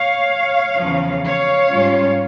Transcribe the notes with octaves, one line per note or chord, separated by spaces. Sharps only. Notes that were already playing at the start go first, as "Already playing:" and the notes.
Already playing: C#5 F5
E2 C#3 F3
C#5 F5
G#2 G3 C#4 F4